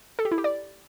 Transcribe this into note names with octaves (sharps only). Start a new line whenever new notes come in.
A4
G4
E4
G4
D5